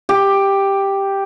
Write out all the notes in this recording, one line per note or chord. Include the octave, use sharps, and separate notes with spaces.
G4